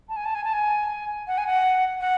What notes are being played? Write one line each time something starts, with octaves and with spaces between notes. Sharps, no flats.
A5
G#5
A5
G#5
A5
G#5
F#5
G#5
F#5
F#5